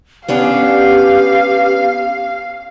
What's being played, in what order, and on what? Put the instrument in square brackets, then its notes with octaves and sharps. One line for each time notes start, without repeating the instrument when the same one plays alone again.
[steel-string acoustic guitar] B3 C#4 D4 [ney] G4 [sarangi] F5